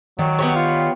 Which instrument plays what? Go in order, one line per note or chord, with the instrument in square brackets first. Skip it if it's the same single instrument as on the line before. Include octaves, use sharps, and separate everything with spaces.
[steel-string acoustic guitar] D#3 D5 [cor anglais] F#3
[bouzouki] B3 G4 C#5
[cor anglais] F4